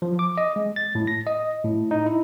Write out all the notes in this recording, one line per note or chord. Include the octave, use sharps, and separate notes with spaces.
F3
D6
D#5
G#3
A6
A2
A#6
D#5
A2
D#4
E4